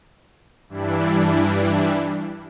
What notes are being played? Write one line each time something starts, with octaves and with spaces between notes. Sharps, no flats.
G2 E3 G3 D4 E4